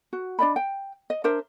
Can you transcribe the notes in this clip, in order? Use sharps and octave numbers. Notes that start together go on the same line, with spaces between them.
F#4
D4 D5 D#5 B5
G5
D#5
D4 A#4 C5 E5